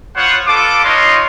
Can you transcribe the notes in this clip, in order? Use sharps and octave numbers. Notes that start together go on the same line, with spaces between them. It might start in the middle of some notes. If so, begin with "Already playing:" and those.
B3 F4 C5 C#5 F#5
F4 A4 B4 D6
D#4 F4 B4 C#5 D#5 C6